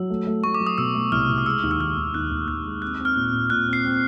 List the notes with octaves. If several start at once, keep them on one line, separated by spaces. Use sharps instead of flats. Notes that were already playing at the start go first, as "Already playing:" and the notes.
Already playing: F#3 E6
A3
A3
A3 C#6
D6
F#3
D#6
B2 E6
A3
C2 F6
C2
D#6
G#3 E6
D#2
E6
D#3 F6
D#2
D#2 F#6
D#2
D#2 F#6
G#3
C4 F#6
C4
F6
A#2
A#2
A#2 F#6
C4 C7
C4